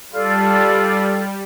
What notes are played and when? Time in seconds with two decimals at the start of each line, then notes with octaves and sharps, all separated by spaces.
0.10 G3 F4 A4 D5
0.68 G3